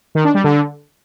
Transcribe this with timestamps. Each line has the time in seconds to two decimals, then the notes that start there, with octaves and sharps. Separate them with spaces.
0.15 D#3
0.25 D4
0.34 G3
0.44 D3